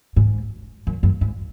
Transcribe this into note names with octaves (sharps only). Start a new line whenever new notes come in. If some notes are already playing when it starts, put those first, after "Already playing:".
G#2
F#2
F#2
G#2